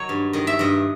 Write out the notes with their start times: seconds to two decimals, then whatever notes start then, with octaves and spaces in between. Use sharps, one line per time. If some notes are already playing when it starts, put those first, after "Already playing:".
Already playing: D#3 F#3 C#5
0.09 G2
0.33 D#3 D#5
0.47 E5
0.59 G2 D#5